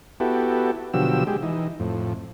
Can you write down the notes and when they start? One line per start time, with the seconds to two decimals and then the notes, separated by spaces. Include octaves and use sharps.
0.20 B3 E4 F#4 G4 A4
0.94 B2 D3 F3 F#3 G4 E6
1.27 G#3 G4
1.43 E3 D#4
1.80 F2 A2